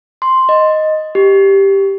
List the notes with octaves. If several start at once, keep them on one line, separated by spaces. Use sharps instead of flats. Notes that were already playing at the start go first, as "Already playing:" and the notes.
C6
D#5
G4